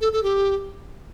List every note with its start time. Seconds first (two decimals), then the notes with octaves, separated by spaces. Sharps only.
0.01 A4
0.13 A4
0.23 G4